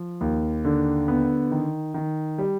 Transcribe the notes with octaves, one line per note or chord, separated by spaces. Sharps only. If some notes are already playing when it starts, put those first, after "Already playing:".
Already playing: F3
D#2
D3
B3
D#3
D#3
G3